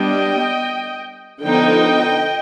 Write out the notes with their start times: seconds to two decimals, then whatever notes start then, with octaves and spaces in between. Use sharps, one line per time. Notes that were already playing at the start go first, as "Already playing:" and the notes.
Already playing: G3 B3 D4 D#5 G5
1.43 D3 F3 B3 D#4 D#5 G5